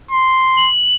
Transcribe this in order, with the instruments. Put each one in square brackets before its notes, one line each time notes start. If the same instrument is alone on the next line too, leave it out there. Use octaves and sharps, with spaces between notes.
[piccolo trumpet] C6
[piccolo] F#7